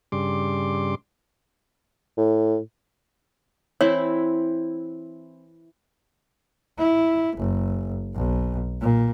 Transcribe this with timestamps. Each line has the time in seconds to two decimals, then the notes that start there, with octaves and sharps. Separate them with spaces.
0.12 G2 C#3 G3 C6 D6
2.17 A2
3.81 E3 C4 E4 C#5
6.79 E4
7.37 F#1
8.15 B1
8.81 A#2